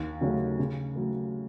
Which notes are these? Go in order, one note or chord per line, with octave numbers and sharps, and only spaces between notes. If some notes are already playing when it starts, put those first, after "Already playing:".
Already playing: D#2
C#3 F#3 A3 C#4
C#3
F#3 A3